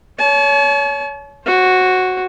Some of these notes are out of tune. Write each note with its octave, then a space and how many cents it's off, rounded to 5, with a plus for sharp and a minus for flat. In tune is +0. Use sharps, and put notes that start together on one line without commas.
C#5 +25 A5 -40
F#4 +0 C5 +35